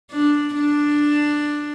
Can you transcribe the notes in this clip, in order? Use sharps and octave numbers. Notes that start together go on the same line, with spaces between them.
D4
D4